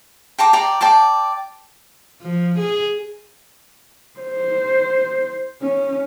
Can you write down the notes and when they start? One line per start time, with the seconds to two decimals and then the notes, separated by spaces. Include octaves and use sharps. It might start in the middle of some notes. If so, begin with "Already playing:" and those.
0.39 G5 A5 A#5 D6
0.53 D5 G5 A#5
0.81 D5 G5 A5 D6
2.21 F3
2.58 G#4
4.20 C5
5.62 C#4